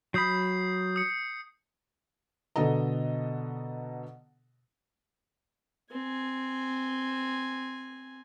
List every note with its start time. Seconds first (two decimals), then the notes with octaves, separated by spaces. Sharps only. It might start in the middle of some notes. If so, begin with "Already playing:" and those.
0.14 F#3 B5 D#6 G6 C7
0.96 D#6 C#7
2.56 B2 D3 A4 D#5 A#5
5.91 C4 G#5